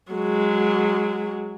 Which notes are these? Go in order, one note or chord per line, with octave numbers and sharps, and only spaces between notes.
F#3 G#3